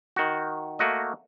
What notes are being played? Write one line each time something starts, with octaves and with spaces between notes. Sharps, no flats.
D#3 F#4
A3 A#3 F#4 D#5